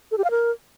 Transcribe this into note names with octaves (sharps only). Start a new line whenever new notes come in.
A4
G4
F5
A#4